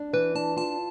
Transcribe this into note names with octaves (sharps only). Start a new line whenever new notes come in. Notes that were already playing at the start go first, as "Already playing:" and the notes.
Already playing: D4
E3 B4
D4 A5
F4 A5